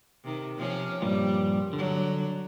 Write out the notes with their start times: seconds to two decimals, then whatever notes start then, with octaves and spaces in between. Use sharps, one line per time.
0.24 C3 D#3
0.57 C3 F3 C#4
1.02 G2 A#2 F3 G3
1.73 D3 F#3 D4